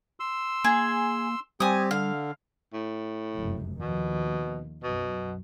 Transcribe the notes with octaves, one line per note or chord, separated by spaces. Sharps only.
C6 E6
A#3 G#4
G3 C4 G4 G#5 D#6
D3 F5
A2
F1 C#2 F#2
D#2 B2 D#3 F3
B1 F#2 B2 F#3